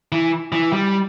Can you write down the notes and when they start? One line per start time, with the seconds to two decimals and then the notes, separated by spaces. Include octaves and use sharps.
0.12 E3
0.52 E3
0.73 G3